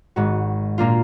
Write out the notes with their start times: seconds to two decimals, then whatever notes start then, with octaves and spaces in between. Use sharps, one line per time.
0.16 G#1 G#2 F#4
0.78 A#2 A#3 D4 F4